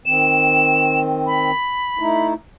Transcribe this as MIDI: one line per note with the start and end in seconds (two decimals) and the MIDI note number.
0.06 1.51 51
0.06 1.51 60
0.06 1.00 100
1.26 2.27 83
1.99 2.34 57
1.99 2.34 63
1.99 2.34 64